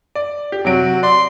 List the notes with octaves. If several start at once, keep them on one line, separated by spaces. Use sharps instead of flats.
D5
G4
C3 F#3 F#4 D7
D5 C6